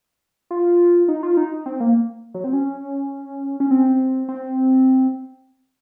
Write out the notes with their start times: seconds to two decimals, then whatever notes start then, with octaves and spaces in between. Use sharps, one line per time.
0.51 F4
1.08 D#4
1.23 F4
1.37 D#4
1.66 C4
1.80 A#3
2.34 F#3
2.44 C4
2.53 C#4
3.60 C#4
3.71 C4
4.29 C4